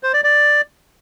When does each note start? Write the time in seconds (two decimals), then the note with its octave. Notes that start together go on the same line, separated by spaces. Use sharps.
0.03 C5
0.13 D5
0.24 D5